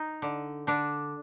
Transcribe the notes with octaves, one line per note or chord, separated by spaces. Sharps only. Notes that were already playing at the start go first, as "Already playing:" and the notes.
Already playing: D#4
D3
D3 D4